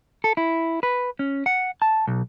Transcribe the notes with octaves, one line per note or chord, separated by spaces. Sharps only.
A4
E4
B4
C#4
F#5
A5
B1